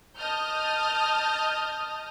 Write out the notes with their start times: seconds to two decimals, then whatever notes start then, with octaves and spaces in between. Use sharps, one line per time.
0.17 D#5 A5 D#6 F6 G6